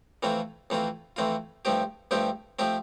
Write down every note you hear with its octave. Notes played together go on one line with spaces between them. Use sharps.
F2 E3 A3 C4 F4
F2 E3 A3 C4 F4
F2 E3 A3 C4 F4
G2 F3 A3 C4 G4
G2 F3 A3 C4 G4
F3 A3 C4 G4